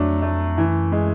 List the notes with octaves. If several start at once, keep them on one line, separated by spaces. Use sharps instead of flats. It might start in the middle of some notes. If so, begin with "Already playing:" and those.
Already playing: F2 F#3 A3 D4
A3
F#2 E3
G#3